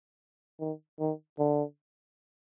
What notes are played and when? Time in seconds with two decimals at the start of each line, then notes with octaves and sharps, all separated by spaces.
0.60 D#3
1.00 D#3
1.39 D3